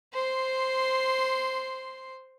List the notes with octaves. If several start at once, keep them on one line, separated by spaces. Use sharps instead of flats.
C5 C6